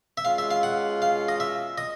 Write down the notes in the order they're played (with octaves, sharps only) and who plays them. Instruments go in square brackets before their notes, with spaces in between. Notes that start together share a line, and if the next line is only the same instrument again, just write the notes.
[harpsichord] E5
[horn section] B2 G#3 C#4 F4 [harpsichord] F5
[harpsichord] E5
F5
F#5
F5
D#5
E5
D#5